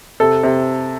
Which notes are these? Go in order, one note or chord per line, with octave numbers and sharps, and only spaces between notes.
C3 A4
C3